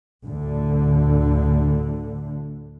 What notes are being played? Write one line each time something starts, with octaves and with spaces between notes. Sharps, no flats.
D2 A2 D3